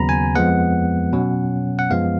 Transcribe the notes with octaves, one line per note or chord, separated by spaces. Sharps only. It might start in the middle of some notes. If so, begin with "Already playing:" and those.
Already playing: D#2 C#3 F#3 B3 A#5 B5
G#5
F2 F3 G#3 B3 F#5
B2 F#3 C#4
F#5
F#2 F3 G#3 B3 F5